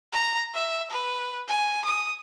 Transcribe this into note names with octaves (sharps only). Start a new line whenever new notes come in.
A#5
E5
B4
G#5
D#6